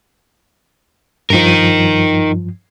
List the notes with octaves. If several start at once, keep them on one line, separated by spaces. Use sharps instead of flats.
G2 F3 D#4 A#4